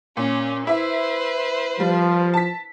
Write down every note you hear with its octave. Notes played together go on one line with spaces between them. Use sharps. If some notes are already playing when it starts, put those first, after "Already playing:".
A#2 C#4
E4 B4 C5 E5
F3 G3
A5 B6